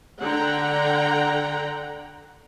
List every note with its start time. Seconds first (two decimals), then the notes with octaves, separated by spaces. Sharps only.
0.22 D3 F#5 G5 A#5